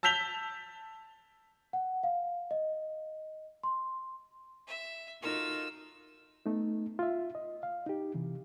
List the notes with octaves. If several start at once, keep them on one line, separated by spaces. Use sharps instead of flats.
A5 E6 G6 B6 F7 G7
F#5
F5
D#5
C6
E5
D#4 F4 F#4 A4 A#4 E6
A3 B3 D#4
F4 E5
D#5
F5
D#4 G4
C3 E3